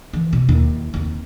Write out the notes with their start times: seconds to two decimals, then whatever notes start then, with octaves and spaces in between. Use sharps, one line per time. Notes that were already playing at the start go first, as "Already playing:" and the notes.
0.13 E3
0.33 B2
0.49 D#2 E4
0.94 D#2 C4